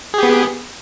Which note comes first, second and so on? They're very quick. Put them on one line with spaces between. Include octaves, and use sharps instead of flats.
G#4 G4 B3